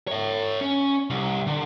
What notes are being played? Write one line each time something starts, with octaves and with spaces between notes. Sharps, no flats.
C#5 E5
C#4
C2
D3